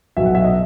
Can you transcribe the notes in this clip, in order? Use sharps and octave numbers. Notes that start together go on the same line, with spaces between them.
B1 B2 F#3 E5
F#5
E5
D#5